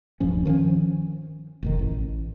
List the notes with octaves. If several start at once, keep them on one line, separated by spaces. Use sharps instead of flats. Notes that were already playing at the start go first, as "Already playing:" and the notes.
D1 G2 F3 C#4
D#3 F3 G#3 C#4
F1 B1 D#3
A1